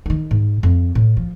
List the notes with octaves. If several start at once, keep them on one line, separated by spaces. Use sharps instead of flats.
D#3 D#4
G#2
F2
A2
F3